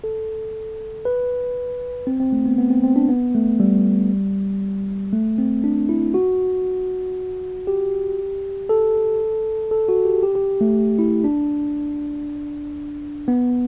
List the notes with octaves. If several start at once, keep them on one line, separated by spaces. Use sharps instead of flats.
A4
B4
C4
C4
A3
B3
B3
C4
C4
D4
B3
A3
G3
A3
C4
D4
E4
F#4
G4
A4
A4
F#4
G4
G4
G4
A3
E4
D4
B3